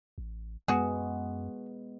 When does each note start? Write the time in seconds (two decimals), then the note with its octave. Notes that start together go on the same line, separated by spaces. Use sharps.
0.18 A1
0.68 F#2 G#3 B3 F#4 G#4